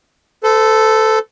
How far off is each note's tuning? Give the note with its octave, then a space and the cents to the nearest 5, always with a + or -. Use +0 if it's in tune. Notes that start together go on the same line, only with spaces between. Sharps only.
A4 +0 C5 -45